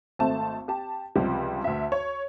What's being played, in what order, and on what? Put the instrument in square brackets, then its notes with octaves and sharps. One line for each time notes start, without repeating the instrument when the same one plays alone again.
[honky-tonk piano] G#1 A3 C4 A5
G4 A5
C#2 C3 F3 G3
D2 E5
C#5